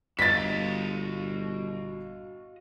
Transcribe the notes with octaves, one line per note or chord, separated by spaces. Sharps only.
G1 F#4 D#5 F5 A6 B6